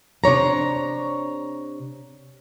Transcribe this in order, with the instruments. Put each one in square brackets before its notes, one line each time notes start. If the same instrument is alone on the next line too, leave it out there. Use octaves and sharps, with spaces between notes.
[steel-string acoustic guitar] C3 D4 C#5 A#5